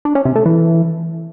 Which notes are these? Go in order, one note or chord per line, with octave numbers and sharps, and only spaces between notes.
D4
C#4
C3
A3
E3